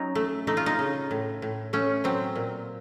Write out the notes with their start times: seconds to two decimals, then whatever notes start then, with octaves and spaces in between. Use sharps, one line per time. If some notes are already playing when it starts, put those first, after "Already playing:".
Already playing: F#3 C#4 D#4
0.15 A3
0.47 A3 D#4
0.57 F4
0.66 D#4
0.79 C#3
1.11 A2
1.42 A2
1.73 A3 C#4
2.04 F#3 C4
2.36 A#2